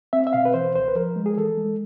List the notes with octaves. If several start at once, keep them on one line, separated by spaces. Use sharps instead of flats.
C4 E5
E5
B2 F5
B4
E3 C5
C#2 C5
B4
F3 A#4
G#3
G#4
E3 A4
G#3